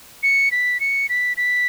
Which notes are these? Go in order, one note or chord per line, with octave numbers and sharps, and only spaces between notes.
C#7
B6
C#7
B6
B6